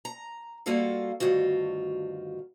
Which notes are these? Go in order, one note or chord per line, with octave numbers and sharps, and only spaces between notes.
A#5
G3 A#3 F4 F#4 A4 F5
D2 G2 D#3 F4 F#4